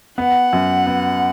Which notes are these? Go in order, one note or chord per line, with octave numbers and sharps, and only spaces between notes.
B3 F#5
F#2
B3